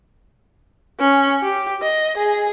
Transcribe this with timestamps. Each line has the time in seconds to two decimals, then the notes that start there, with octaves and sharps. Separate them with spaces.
1.00 C#4
1.43 G4
1.82 D#5
2.17 G#4